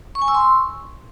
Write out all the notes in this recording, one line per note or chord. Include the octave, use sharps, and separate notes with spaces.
C#6
G#5
E6
C6
C#6